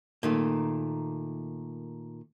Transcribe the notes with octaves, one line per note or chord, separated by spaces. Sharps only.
A#2 D#3 A3